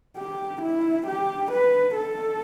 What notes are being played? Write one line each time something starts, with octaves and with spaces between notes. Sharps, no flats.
G4
E4
G4
B4
A4